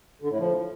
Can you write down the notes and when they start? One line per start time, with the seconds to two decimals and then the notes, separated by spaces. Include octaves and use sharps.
0.22 D3
0.30 A2
0.38 F3